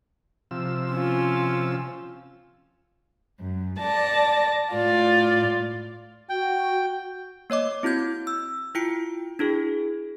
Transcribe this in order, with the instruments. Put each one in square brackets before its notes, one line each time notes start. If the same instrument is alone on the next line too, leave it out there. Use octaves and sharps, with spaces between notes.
[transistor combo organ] C3 F3 E6
[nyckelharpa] C#4 F4
[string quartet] F#2
D5 A5 A#6
A2 F4 D5
[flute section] F#4 [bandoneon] G5
[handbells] A#3 C#5 D#5 D6
C4 E4 F#4 G6 G#6
E6
E4 F4 G5 C#7 D7
D4 E4 F#4 G#4